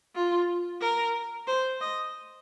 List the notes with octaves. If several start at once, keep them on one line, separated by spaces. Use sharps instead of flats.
F4
A#4
C5
D#5